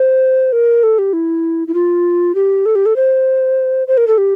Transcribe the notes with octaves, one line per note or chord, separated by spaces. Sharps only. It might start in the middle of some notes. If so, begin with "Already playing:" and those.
Already playing: C5
A#4
A4
G4
E4
E4
F4
G4
A4
G4
A4
C5
C5
A#4
A4
G4